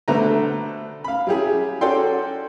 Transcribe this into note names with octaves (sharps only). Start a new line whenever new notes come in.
B2 D3 A3 B4 C5 A#5
F5 B5
F#3 E4 G4 G#4
C#4 F#4 A4 D5 G5 C6